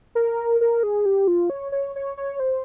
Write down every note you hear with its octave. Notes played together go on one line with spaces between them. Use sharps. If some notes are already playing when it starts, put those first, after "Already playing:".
A#4
A#4
G#4
G4
F4
C#5
C#5
C#5
C#5
C5